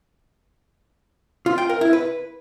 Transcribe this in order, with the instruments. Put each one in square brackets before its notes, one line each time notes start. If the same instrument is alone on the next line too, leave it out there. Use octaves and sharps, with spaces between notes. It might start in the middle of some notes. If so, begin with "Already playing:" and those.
[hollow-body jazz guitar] F4
G5
A#4
E4
B4